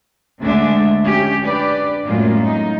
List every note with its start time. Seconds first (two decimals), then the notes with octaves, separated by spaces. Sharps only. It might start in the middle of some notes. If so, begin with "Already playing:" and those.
0.41 D2 D3 G#3 D4 E5
1.03 C#4 G4
1.42 D4 G4 B4 D5
2.05 F#2 A2 G#3 A#3 F4
2.45 D#4